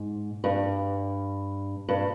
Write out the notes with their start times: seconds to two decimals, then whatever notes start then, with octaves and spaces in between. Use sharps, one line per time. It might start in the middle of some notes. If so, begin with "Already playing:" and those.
Already playing: G#2
0.44 G2
1.89 G2